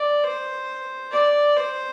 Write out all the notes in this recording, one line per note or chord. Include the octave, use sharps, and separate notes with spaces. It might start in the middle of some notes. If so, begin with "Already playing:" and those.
Already playing: D5
C5
D5
C5